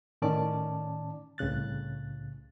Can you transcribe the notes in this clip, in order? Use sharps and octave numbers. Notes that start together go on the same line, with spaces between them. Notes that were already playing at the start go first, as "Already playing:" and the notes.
A2 D#3 C#4 D5 A5 D6
C2 A2 C#3 F#6 A6